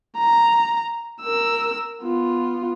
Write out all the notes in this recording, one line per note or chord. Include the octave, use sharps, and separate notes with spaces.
A#5
A#4 E6
B3 F4